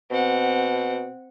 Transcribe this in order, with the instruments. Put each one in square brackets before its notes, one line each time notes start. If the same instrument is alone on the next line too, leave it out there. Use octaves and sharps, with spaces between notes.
[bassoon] B2 [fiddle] C4 F#5